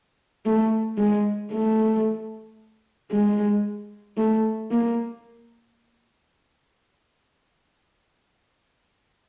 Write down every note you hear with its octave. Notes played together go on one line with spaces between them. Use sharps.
A3
G#3
A3
G#3
A3
A#3